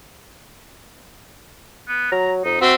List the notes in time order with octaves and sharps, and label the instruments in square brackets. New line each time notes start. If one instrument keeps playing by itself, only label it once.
[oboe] B3
[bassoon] F#3 [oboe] A#5
[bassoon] F2 [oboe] D#4
[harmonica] C4 [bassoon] F#4 [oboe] E5